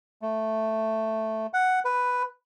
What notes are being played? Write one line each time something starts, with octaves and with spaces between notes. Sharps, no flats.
A3
F#5
B4